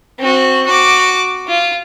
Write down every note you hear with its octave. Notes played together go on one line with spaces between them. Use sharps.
C4 F#4
F#4 D6
F4